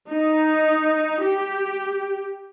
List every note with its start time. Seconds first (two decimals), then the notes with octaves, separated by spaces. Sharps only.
0.12 D#4
1.25 G4